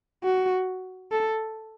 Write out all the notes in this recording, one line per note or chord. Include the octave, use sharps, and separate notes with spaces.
F#4
A4